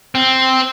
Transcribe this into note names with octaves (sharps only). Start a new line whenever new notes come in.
C4